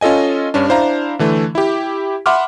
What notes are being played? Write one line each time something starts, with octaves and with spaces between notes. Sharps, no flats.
C#4 F4 A4 D#5 G#5
G2 C#4 D4
D4 E4 C5 F5 A#5
D3 E3 A3
E4 G4
E5 F#5 B5 C6 D6 F6